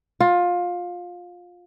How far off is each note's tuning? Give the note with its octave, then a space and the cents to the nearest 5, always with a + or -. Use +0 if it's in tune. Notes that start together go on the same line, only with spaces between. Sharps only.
F4 +20